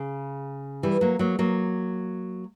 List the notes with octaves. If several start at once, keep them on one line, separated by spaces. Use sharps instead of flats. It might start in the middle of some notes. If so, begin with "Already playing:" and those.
Already playing: C#3
E3 G3
F#3 A#3
F#3 A#3
F#3 A#3